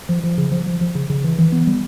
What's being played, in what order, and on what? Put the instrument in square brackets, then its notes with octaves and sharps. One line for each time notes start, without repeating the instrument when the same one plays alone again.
[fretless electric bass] F3
F3
C#3
F3
F3
F3
C#3
C#3
E3
E3
B3
G3